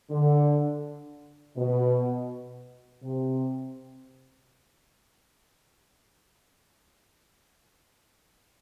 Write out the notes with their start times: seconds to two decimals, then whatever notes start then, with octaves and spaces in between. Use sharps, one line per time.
0.11 D3
1.57 B2
3.03 C3